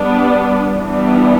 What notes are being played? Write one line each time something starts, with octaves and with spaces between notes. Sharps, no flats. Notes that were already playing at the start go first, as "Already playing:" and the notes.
Already playing: G3 B3 D4
E3 G3 B3 D4